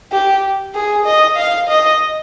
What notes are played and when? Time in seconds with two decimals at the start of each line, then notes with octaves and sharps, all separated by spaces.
0.12 G4
0.74 G#4
1.05 D#5
1.36 F5
1.68 D#5